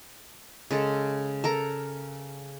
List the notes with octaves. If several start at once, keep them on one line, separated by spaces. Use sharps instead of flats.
C#3 G#3 A4
A4 A#4 A#5